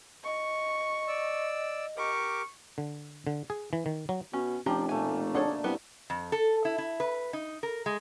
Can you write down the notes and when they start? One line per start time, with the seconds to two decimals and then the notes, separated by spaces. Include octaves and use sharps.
0.24 D#5 C#6
1.08 D5 E6
1.97 G4 A#4 C#6 D6
2.78 D3
3.27 D3
3.50 G#4
3.73 E3
3.86 D#3
4.09 F#3
4.33 B2 C#4
4.66 F1 F3 C#4 D4 G4 A#5
4.89 B2 A3 A#3 G#5
5.35 D4 G#4 A4 C#5 D5 F#5
5.64 C2 G3 B3
6.10 F2
6.32 A4
6.65 E4
6.78 E4
7.00 B4
7.33 D#4
7.63 A#4
7.86 G#3